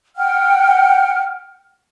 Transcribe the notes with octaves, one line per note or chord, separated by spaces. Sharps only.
F#5 G5 F6